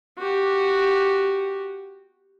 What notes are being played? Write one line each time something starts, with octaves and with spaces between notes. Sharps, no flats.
F#4 G4